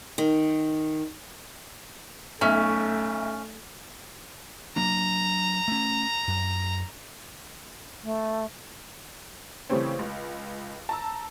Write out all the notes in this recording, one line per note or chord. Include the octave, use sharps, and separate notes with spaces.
D#3
B1 A3 C#4 E5
F#3 A#3 D4 A#5
A3 C#4
F#2
A3
C#3 E3 G3 A3 C4 C#4
C#2
A5 A#5 E6